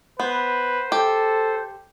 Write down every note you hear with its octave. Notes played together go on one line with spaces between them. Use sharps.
B3 B4 C5
G4 A4